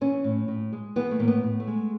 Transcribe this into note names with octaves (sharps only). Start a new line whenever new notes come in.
E3 C#4
A2
A2
G#3
E3 B3
A3
A2 A#3
B3
A2
A3
G#3